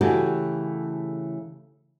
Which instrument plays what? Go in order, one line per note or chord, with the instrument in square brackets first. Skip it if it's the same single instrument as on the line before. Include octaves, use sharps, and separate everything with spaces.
[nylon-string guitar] C#3 E3 A3 F#4 G4 A4